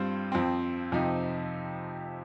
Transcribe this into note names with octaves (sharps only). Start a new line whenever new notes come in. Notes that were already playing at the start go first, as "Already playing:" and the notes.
Already playing: G2 G3 C4 F4 C5
F2 F3 C4
F2 C3 F3 D#4